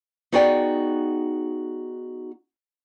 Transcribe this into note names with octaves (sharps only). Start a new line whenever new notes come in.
B3 D#4 F#4 G#4 D5 G5